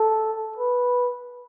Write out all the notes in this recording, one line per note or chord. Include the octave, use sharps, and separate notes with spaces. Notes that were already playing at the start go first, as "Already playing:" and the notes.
Already playing: A4
B4